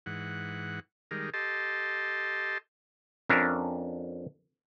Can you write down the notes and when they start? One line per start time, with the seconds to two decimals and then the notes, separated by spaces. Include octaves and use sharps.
0.06 G#2 E3 F#5
1.11 D#3 G3 G#3 A#4
1.33 G4 A4 D#5 A5 C6
3.29 F2 C#4 D4 A#4 E5